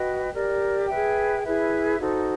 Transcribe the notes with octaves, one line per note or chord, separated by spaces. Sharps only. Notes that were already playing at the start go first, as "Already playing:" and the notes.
Already playing: F#4 B4 D#5 G5
G4 A#4 D5
G#4 B4 E5 G5
E4 G#4 B4 E5
D#4 F#4 A4 C5